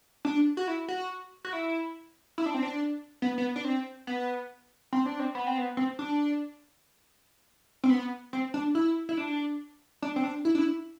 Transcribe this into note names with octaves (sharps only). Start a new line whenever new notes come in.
D4
F#4
E4
F#4
F#4
E4
E4
D4
C4
D4
B3
B3
D4
C4
B3
C4
D4
C4
B3
C4
B3
C4
D4
C4
B3
C4
D4
E4
E4
D4
D4
C4
D4
E4
D4
E4